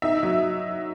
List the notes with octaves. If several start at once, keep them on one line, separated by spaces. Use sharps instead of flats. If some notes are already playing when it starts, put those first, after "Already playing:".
D#4 E5
F#3